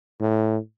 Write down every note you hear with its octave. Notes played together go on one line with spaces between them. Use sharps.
A2